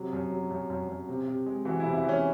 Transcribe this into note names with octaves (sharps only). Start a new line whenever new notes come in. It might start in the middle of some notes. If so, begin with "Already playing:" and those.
Already playing: C3 F#3
F#2
F#3
F#2
F#2
F#2
C3
C3
G#3
E3 F#4
E4
C3
E4
E3
C#4